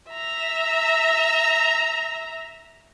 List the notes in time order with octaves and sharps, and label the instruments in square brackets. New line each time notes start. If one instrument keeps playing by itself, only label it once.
[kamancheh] E5 A#5